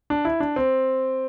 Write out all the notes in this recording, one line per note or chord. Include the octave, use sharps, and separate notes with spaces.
D4
E4
D4
C4